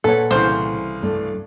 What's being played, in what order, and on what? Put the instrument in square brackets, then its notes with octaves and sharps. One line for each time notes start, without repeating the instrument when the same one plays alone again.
[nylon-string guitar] A#2 F#5 [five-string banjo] A4 [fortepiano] B4 C#5
[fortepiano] C2 C#3 E3 [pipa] C5
[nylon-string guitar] G2 A3 D4